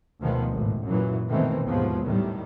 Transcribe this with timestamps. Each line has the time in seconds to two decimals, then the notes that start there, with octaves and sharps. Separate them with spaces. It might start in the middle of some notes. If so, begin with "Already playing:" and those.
0.20 D2 B2 D#3 F3 G#3 B3
0.52 G#1 A2
0.86 F#2 A#2 E3 F#3
1.29 B2 D#3 E3 G#3 A3 C4
1.66 D#2 G#2 F3 F#3 G#3 B3
2.05 A2 D#3 G3